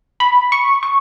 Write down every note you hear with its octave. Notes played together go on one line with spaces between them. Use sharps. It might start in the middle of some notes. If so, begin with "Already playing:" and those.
B5
C#6
C#6